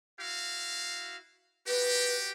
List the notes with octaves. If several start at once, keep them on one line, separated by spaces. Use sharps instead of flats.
E4 F#4 F5
F#4 G4 B4